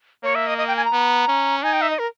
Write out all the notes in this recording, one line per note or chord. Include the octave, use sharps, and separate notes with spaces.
A#3 C#5
E5
D#5
D#5
G5
G#5
A#5
B3
C#4
D#4 G#5
G5
E5
D#5
A#4